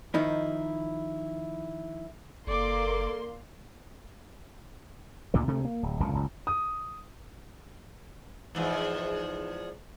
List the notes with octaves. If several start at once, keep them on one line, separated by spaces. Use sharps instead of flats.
D#3 F3 D#4 E4
F#1 A#3 A4 D5 C6 D6
D2 A#2 D3 D#3
D2 C3 A3
A#3
D1
F1 C#2 A#2 D3
F#1 C#2
D#6
E2 G#2 F3